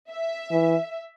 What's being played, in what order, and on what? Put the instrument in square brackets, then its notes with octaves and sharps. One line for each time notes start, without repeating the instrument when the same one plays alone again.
[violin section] E5
[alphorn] E3